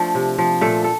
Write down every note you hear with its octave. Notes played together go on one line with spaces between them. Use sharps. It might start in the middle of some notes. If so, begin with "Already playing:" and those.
Already playing: F3 A3 D4 A4
C3
F3
A#2 A3 A4
A4